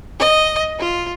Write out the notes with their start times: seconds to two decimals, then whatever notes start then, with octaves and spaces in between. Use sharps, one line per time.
0.19 D#5
0.79 F4